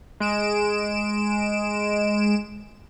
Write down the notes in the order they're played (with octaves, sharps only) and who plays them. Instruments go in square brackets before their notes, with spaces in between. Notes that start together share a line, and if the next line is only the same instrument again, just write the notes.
[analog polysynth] G#3 D7 E7